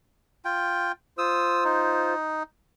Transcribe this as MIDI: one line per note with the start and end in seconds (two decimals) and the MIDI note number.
0.45 0.92 65
0.45 0.92 79
1.18 2.14 65
1.18 2.14 72
1.18 1.64 87
1.18 1.64 88
1.65 2.43 63